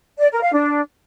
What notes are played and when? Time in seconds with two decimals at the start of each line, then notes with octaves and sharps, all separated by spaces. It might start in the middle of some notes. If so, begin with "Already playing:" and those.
0.20 D5
0.31 A#4
0.42 F5
0.53 D4